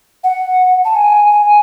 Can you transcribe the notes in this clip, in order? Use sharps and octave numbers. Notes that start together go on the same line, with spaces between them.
F#5
A5
G#5
G#5